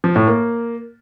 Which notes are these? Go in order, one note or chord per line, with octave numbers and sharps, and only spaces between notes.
F3
A2
A#3